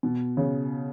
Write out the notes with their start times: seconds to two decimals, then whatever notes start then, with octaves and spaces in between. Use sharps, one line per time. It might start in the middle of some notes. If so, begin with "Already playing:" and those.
0.03 B2
0.37 C#3